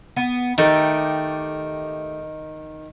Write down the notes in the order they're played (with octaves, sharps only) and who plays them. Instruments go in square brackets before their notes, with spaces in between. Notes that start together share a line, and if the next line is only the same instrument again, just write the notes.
[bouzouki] B3
[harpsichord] D#3 [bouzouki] A3 D#4 G4